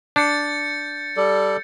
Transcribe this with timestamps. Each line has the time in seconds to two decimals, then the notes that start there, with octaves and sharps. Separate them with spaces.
0.16 D4 G6 A6 C#7
1.17 G3 A4 D5